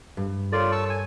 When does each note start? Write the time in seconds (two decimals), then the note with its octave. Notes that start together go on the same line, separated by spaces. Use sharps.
0.17 G2
0.52 F4 A4 A#4 C#5 D5 A6
0.72 A5 C#6 E6
0.90 G#5